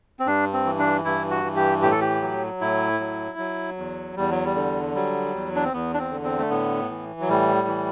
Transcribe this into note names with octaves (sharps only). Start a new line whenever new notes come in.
C4
G2 D4
C4
E3
D4
G2 E4
F#4
E3
G4
A2 G4
A4
G4
F#3
A2 E4
F#3
F#3
E2
E2 G3
F#3
G3
D3
F#3 G3
E2
D4
C4
E2 B3
D4
C4
D3
C4
A3
A2 B3
E3
F#3
A2 G3
E3